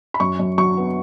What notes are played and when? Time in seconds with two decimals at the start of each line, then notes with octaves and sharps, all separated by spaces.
0.14 B5
0.20 F#2 C#6
0.39 F#2
0.58 F#3 C#6
0.77 B3